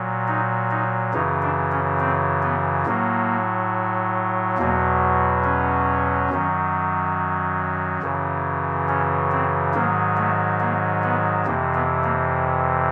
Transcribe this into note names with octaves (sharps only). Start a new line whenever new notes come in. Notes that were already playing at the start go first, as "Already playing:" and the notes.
Already playing: A#2 F#3
D#4
D#4
F#2 C#3 E3 D#4
D4
C#4
C4
B3
A2 F#3 A#3
E2 B2 F#3 A#3
C#4
F#2 D#3 F#3
F#2 C#3 E3
C#4
C4
G#2 D#3 F#3 A#3
A3
A#3
B3
F2 C3 E3 A#3
B3
A#3